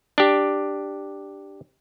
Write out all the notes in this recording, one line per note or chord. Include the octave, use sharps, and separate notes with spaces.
D4 G4